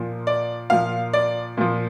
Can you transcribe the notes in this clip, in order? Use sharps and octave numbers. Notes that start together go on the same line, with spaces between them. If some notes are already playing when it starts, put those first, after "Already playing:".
Already playing: A#2 F3
D5
A#2 F3 F5
D5
A#2 F3